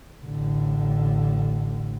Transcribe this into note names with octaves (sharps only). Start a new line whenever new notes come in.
A1 D3